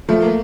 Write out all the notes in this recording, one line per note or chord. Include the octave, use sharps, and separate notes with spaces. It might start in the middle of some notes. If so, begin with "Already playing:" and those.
F3 A3
A#3